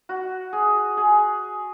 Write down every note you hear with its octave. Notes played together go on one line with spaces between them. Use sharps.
F#4
G#4
G#4